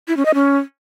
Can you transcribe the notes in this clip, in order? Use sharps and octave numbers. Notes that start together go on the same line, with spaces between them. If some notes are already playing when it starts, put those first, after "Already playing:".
E4
C#4
D#5
C#4